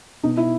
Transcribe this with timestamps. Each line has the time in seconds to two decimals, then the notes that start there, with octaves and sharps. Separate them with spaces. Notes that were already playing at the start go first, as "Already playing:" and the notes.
0.23 B2 D#4
0.37 E4